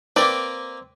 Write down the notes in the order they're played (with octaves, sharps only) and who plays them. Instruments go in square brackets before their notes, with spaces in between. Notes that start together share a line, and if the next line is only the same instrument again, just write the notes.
[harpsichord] A#3 A#4 B4 [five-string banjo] C4 D5